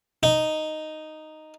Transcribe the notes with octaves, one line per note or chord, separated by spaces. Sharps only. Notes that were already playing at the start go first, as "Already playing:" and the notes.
D#4